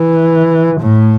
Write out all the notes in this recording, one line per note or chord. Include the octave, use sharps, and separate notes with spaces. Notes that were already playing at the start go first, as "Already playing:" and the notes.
Already playing: E3
A2